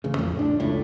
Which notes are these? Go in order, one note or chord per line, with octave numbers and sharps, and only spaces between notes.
A1 C#3
F2 A2
D4
F#1 C#2 A2